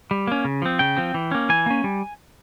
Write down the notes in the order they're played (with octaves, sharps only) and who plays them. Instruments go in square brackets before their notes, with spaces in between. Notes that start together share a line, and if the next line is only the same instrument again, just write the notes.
[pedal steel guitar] G3
A#3 C#4
C#3
F3 C4
C#3 G5
F3 C4
E3
A#3 C#4
E3 G#5
A#3 C#4
G3